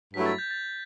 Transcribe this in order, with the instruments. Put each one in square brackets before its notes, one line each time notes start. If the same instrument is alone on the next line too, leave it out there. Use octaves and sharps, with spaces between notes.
[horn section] G2 F#3 A3 E4 [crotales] B6
[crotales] A6
G6
A6